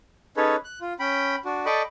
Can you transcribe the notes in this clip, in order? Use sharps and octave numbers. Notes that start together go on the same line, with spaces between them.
C#4 D#4 G#4 A4 B4 C#5
F#6
F4
C#4 G5 B5
D4 F#4
A4 D5 D#5 G5 B5 C#6